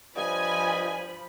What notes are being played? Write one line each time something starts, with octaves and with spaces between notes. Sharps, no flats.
G2 F3 D#5 G#5 B5